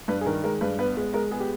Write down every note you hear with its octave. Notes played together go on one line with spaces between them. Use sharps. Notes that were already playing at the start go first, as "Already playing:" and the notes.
G2 B4
G#4
D#3 A#4
G#3 A#4
G2 B4
B3 B4
G#3 B4
G#3 A#4
B3 G#4
G4